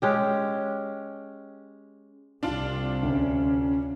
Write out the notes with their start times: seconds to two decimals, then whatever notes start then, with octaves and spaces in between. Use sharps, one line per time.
0.02 G#3 C#4 G4
2.43 C2 C3 D4 F4 D5
3.03 D2 C#4